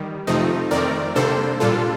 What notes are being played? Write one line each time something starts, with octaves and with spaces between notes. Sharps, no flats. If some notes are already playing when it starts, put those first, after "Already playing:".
Already playing: D#3 G3
F2 C3 F3 A3 C4 D#4
F2 D#3 A3 C4 A#4 D5
C3 G3 A#3 D4 A4 C5
A#2 G3 D4 F4 A4